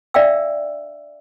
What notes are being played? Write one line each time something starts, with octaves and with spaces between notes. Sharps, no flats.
D4 D5 E5 F5 G5 E6